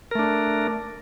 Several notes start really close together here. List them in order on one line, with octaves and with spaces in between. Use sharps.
A#4 A3 D4